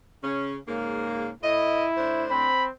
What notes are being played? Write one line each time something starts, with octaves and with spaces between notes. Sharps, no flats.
C#3 C#4
G#2 C#3 A#3
A2 E4 D#5
A2 D4 C5
C4 B5